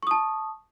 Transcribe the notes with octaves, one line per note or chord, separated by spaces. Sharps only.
A5 C#6 D#6